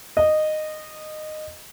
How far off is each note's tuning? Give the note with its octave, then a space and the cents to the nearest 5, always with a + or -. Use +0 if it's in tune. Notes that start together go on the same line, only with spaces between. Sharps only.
D#5 -15